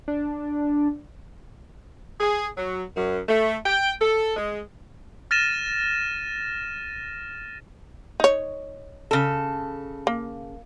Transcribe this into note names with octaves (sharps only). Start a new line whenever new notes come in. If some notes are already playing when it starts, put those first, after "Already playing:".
D4
G#4
F#3
F#2
A3
G5
A4
G#3
F6 A6 A#6 D#7 E7
D#4 C#5
C#3 A4
A#3